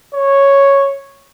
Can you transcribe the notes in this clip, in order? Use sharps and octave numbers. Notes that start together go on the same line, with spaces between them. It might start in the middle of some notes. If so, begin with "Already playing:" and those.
C#5